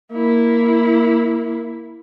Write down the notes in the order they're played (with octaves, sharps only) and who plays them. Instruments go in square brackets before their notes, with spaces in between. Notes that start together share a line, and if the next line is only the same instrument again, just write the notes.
[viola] A#3 E4